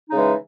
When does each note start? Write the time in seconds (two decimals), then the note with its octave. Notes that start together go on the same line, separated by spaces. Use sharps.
0.09 D#4
0.12 C#3
0.14 G#3
0.17 E3